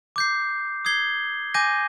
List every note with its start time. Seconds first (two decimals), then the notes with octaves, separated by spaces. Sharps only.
0.16 D6 G6 C7
0.85 D#6 G#6 C7 G7
1.54 G#5 D6 G6 A#6 D#7